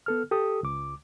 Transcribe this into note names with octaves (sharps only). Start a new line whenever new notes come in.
B3 A4 F6
G4 A4 D#6
C#2 D6